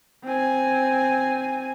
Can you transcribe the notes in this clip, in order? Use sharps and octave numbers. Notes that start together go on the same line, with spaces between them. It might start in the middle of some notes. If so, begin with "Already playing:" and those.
C4 G#5